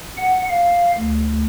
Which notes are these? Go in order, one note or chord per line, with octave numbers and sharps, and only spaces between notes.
F#5
F5
D2